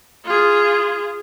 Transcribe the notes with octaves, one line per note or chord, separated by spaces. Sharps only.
F4 G#4